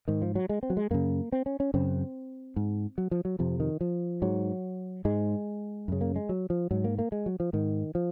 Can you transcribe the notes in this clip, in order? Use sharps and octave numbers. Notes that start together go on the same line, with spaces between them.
G#2 D#3
F3
F#3
G#3
C4
F#3
G#3
F#2 C#3 A#3
C4
C#4
C#4
F#2 C#3 C4
G#2
F#3
F3
F#3
F2 C3 F3
D#3
F3
G#2 F#3
G#2 G#3
F#2 C#3
A#3
G#3
F#3
F3
G#2 F#3
A#3
A#3
G#3
F#3
F3
G#2 D#3
F3